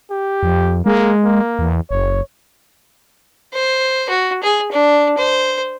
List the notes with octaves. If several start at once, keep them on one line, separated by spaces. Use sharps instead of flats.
G4
F2
G#3 A#3
A#3
E2
F#1 C#5
C5
F#4
G#4
D4
C5